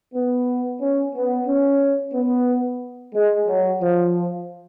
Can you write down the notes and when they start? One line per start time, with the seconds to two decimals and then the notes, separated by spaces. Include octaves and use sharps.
0.14 B3
0.80 C#4
1.15 B3
1.48 C#4
2.14 B3
3.14 G#3
3.48 F#3
3.81 F3